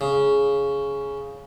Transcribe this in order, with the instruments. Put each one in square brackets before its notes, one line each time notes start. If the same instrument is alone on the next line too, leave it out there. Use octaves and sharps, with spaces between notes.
[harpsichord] C#3